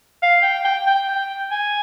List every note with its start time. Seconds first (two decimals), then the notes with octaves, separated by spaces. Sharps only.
0.22 F5
0.43 G5
0.65 G5
0.86 G5
1.08 G5
1.51 G#5